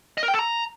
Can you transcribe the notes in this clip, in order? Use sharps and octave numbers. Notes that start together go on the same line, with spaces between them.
D#5
A#4
G5
A4
A#5